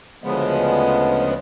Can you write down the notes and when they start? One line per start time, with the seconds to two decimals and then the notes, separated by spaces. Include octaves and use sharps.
0.24 D2 C#3 F3 G#3 B3